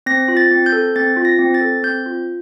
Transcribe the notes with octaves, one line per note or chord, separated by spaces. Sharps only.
C4 A#6
F4
A6
C4
G6
A4
C4 A6
F4
A#6
C4
A6
A4
C4 G6
F4